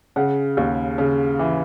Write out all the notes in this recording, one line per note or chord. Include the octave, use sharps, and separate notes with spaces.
C#3 F#5
D#2
C#3
E3